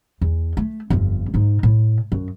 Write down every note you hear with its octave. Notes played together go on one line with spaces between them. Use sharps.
E2
A3
G1 F2
G#2 D#4
A2
F#2